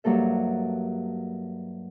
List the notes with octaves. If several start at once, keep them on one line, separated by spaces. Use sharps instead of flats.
G2 F#3 A#3 A4 E5